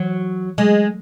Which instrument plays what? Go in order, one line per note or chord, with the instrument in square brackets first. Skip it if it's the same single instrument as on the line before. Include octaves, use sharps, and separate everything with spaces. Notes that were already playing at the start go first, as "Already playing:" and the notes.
Already playing: [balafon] E3 [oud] F#3
[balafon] F#3 [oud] G#3